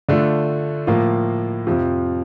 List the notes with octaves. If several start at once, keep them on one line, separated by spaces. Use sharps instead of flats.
D3 A3 D4 F4
A2 F3 A#3 F4
F2 C3 F3